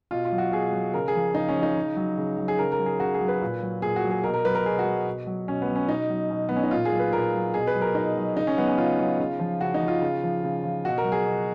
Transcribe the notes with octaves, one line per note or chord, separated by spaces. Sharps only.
B2 F4
F4
F#3
F#4
B2 G#4
F#3
C#3 A#4
G#4
F3
C#3 D#4
C#4
F3
D#4
C#3
F#3
C#3
F#3
G#4
C#3 A#4
A#4
F#3
G#4
C#3 F#4
G#4
F#3
B4
A#2
F#3
A#2 G#4
F#4
F#3
G#4
B2 A#4
A#4
F#3 B4
A#4
B2 G#4
F#4
F#3
B2
F#3
B2 C#4
B3
F#3
C#4
B2 D#4
F#3
B2
F#3 B3
C#4
D#4
A#2 F4
G#4
F#3
B4
A#2 A#4
F#3
B2 G#4
B4
F#3
A#4
B2 D#4
F#3
C#3 D#4
C#4
F#3 B3
C#4
C#3 F4
F#3
C#3
F3
C#3 F#4
D#4
F3
F4
C#3
F3
C#3
F3
B2 F#4
A#4
F#3
G#4
B2